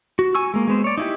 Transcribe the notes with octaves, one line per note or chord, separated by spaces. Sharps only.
F#4
G#5 C#6 E6
G#3 A#3
G#3 B3 C5
C#5 D5
D#4 E4 G4